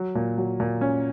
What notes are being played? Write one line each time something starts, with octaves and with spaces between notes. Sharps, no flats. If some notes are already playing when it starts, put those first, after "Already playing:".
Already playing: F#3
A#2
F#3
A#2
C#4